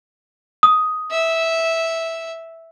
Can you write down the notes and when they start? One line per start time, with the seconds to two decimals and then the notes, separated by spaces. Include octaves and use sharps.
0.63 D#6
1.11 E5